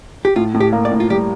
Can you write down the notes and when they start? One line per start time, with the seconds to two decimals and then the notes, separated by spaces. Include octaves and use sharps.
0.25 G4
0.36 A2 F4
0.54 A2
0.60 G4
0.73 A#3
0.85 D5
0.91 A2
1.00 F4
1.10 G3 G4